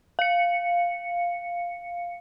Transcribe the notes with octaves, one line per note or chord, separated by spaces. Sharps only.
F5 C#7